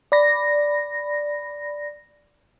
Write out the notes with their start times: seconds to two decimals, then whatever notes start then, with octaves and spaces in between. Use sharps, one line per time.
0.12 D5 B5 A#6